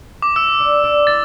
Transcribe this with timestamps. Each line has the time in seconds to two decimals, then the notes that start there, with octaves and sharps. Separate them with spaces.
0.22 D6
0.36 E4 E6
0.60 D4
0.84 D4
1.07 E4 A6